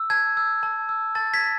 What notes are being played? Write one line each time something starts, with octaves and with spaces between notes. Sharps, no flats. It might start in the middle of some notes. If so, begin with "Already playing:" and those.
Already playing: E6
A5 G#6
E6
A5
E6
A5 A6
G#6 B6
A5